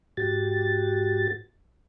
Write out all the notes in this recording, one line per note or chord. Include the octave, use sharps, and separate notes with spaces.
G#2 F#4 G4 A6